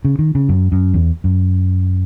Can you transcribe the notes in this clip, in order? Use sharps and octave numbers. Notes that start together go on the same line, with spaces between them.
C#3
D#3
C#3
F#2
F#2
E2
F#2